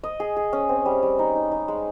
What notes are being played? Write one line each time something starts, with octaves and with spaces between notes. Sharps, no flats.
D#5
G#4
G#4
C#4
C4
G3
G3
D#4
D#4
D#4
G#3